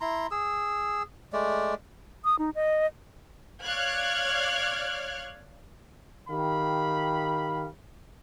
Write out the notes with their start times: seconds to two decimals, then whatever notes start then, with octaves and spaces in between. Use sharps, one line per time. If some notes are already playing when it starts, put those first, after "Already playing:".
0.01 E4 A#5 C6
0.31 G#4 E6
1.33 G#3 A3 D5
2.25 D#6
2.39 D#4
2.55 D#5
3.64 C#5 D5 F5 F6 F#6 G#6
6.28 D#3 G4 F5 B5